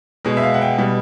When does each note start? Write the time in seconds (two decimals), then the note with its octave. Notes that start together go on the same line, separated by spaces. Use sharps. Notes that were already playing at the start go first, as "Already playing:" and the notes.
0.25 B2 G#3
0.37 E5
0.42 F5
0.54 F#5
0.62 G5
0.78 B2 G3